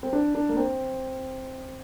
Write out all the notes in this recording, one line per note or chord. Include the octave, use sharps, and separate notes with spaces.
C4
D4
D4
A#3
C4